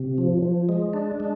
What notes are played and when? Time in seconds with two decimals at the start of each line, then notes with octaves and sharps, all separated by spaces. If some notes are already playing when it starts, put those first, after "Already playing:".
Already playing: C3
0.18 F3
0.42 F3
0.69 G#3
0.93 D4
1.20 G#3